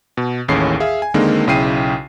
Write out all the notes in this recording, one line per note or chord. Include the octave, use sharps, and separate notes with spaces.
B2
A1 D#2 A2 C#4 G#4 C7
G#4 E5 F5
G#5
D3 D#3 G#3 A#3 C4 D#4
B1 C#3 E4 G5 C7 D#7